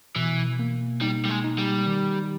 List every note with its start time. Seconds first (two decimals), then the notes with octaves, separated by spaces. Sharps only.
0.16 B2 E3
0.59 A#3
1.01 G3 D#4
1.25 G3
1.29 G#3
1.44 D#4
1.58 G3
1.86 D#3